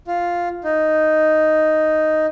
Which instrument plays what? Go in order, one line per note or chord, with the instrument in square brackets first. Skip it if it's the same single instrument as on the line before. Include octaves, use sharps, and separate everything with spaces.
[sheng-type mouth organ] F4
D#4